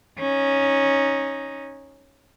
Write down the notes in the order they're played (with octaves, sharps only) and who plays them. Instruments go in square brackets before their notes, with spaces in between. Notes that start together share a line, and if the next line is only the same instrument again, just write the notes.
[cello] C#4 D#4